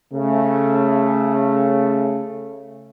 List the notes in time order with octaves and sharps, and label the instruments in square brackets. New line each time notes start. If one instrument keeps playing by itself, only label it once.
[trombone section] C#3 A3